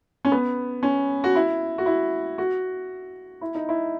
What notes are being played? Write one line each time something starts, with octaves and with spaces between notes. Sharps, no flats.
C#4
B3
C#4
F#4
E4
F#4
E4
F#4
E4
D#4
E4